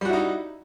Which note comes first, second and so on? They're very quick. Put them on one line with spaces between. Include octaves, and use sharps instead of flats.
G3 F#4 E4 D#4